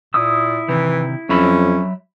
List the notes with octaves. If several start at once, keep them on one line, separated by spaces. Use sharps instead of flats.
A#2 E4 D#6 E6
C3 D#3 E3
F2 F#3 C#4 E5 B5